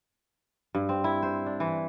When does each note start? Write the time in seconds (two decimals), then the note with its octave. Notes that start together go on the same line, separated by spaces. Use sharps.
0.75 G2
0.89 C4
1.04 E4
1.23 C5
1.46 D4
1.60 E3